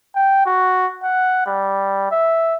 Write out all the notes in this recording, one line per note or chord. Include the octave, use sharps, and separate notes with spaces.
G5
F#4
F#5
G3
E5